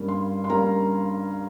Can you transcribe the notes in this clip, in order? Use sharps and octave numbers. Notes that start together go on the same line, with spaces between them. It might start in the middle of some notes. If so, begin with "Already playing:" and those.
Already playing: G2 G3 A#3 C#4
C6
C6
G3 A#3 C#4 A#5